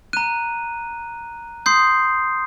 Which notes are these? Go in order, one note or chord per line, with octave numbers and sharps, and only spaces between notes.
A#5 F#6 D#7
C6 D#6 G6 C7